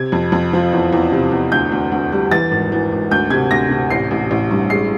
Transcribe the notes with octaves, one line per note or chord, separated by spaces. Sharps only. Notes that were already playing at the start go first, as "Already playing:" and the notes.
Already playing: C3 G#6
F2
F2
F3
E2
E2
C3
E2
D2 G6
D2
D2
G3
E3 A6
G#1
E3
G#1
D2 G6
C3 G#6
D2 A#6
C3
A1 C7
A1
A1
G2
G#3 C7